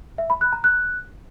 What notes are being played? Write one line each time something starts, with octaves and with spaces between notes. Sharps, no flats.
E5
B5
F#6
A#5
F#6